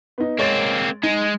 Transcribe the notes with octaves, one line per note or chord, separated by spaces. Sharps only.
B3 D#4
G#3 A#3 C4 C#5 A6
G#3 D#4